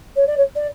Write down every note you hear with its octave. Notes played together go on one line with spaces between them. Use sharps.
C#5
D5
C#5
D5